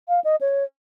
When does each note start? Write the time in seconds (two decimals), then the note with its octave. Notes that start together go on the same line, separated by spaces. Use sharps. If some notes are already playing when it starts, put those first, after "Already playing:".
0.09 F5
0.24 D#5
0.41 C#5